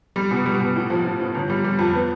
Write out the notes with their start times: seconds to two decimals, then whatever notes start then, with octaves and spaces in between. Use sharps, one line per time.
0.16 G3
0.31 B2
0.46 G3
0.61 B2
0.76 A2
0.90 F3
1.05 A2
1.20 A2
1.35 G1
1.50 G3
1.64 G3
1.79 F2
1.94 B3